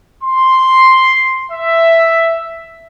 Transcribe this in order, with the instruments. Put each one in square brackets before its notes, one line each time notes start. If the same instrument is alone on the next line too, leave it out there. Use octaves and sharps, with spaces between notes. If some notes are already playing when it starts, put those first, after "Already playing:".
[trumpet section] C6
E5